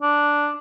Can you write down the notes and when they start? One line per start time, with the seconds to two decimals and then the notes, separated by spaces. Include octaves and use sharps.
0.02 D4